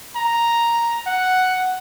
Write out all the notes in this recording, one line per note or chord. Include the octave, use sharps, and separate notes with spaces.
A#5
F#5